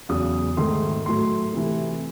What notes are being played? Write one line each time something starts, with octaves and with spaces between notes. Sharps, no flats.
E2 C#3 F#3 D#6
G#2 D#3 A3 C6
A2 F#3 A3 C6
C3 E3 A3